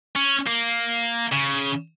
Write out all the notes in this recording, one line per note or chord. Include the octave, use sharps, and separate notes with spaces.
C#4
A#3
C#3